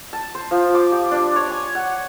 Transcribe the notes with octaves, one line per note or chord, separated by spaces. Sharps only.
A5
C5
F3
D6
G4
D4
C#5
G#5
F#5